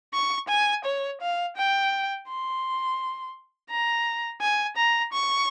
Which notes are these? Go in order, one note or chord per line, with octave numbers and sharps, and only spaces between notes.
C#6
G#5
C#5
F5
G5
C6
A#5
G#5
A#5
C#6